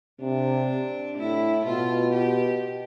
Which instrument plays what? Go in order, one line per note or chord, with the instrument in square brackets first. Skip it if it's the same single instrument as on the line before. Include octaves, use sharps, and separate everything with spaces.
[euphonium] C3 [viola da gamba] D4
[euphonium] A2 [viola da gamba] E4
[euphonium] B2 [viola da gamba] F4
[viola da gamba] G4